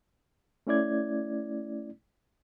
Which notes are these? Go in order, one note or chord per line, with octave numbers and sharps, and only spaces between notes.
A3 C#4 E4 D5 G#6